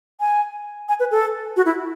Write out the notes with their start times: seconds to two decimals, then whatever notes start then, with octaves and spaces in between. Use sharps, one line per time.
0.20 G#5
0.89 G#5
1.00 B4
1.11 A4
1.56 F#4
1.66 E4